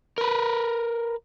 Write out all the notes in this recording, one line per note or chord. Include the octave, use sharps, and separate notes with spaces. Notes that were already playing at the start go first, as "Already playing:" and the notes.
A#4 B4